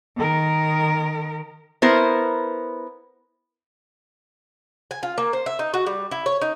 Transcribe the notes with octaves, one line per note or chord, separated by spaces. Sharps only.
D#3 A#4
B3 E4 A#4 C5
G#5
F4
A#3
C5
E5
D#4
F#4
G3
E4
C#5
D#4